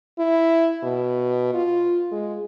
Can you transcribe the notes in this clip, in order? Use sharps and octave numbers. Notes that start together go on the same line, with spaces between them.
E4
B2
F4
G#3